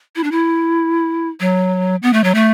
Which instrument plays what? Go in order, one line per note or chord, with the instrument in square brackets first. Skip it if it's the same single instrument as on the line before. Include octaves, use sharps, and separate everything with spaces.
[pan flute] E4
D4
E4
F#3
B3
A3
F#3
A3